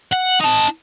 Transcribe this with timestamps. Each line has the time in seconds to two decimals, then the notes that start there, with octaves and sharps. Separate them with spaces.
0.13 F#5
0.41 D#4 A5